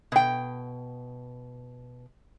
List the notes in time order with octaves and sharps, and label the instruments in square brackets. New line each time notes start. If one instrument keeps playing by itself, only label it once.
[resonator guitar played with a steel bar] B2 G5